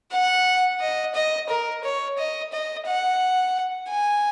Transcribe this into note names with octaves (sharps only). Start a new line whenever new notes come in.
F#5
D#5
D#5
A#4
C#5
D#5
D#5
F#5
G#5